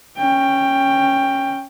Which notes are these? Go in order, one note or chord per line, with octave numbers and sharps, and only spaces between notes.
C#4 G5